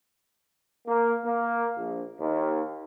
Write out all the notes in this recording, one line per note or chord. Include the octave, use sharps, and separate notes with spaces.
A#3
A#3
A#1
D#2